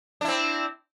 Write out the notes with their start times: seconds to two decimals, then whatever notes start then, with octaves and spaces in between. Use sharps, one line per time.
0.21 D4
0.25 E4
0.28 C4